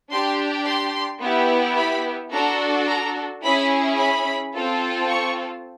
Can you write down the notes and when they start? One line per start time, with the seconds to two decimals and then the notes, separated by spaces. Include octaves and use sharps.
0.12 D4 G4 C6
0.67 C6
1.22 B3 E4 G4
1.78 B5
2.32 D4 F#4 A4 A#5
2.88 A#5
3.43 C#4 E4 G#4 B5
3.98 B5
4.54 C4 F4 A4
5.09 C#6